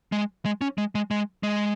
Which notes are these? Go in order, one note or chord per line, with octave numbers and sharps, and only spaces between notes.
G#3
G#3
C#4
G#3
G#3
G#3
G#3